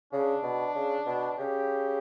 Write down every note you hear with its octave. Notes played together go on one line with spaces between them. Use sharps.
C#3 D4
B2
C#3
B2
C#3 G4